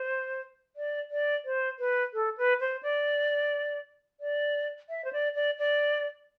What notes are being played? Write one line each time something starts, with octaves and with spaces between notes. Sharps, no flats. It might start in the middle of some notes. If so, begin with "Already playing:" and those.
Already playing: C5
D5
D5
C5
B4
A4
B4
C5
D5
D5
E5
C5
D5
D5
D5